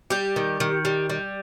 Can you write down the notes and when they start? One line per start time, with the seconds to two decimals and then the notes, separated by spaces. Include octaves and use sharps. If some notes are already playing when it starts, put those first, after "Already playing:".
0.10 G3 G4
0.36 D#3
0.60 D#3
0.85 G3
1.10 G3